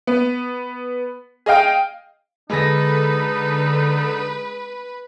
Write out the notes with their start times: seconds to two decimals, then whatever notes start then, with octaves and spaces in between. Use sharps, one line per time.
0.07 B3
1.46 G#4 D#5 F5 G5
2.50 D3 G#3 D#4 G#4 A4 B4 A#6